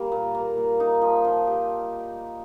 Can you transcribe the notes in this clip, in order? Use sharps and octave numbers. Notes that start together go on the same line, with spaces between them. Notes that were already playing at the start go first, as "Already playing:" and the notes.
Already playing: G3 A#3
A#2
A#3
A#2
D#4
F3
F3
G4